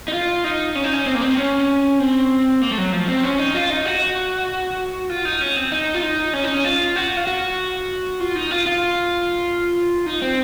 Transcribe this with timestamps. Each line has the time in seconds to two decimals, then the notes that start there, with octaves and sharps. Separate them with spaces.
0.08 D#4
0.13 F4
0.44 D#4
0.75 C#4
0.84 D#4
0.93 C#4
1.06 C4
1.15 A#3
1.22 C4
1.38 C#4
1.99 C4
2.61 A#3
2.71 A3
2.78 F#3
2.92 F3
3.08 C4
3.23 C#4
3.39 D#4
3.55 F4
3.70 D#4
3.86 F#4
5.10 F4
5.25 D#4
5.41 C#4
5.56 C4
5.72 D#4
5.95 F4
6.03 D#4
6.33 C#4
6.44 D#4
6.54 C#4
6.65 F4
6.96 F#4
7.17 F4
7.27 F#4
8.20 F4
8.35 D#4
8.51 F4
8.66 F4
10.06 D#4
10.22 C4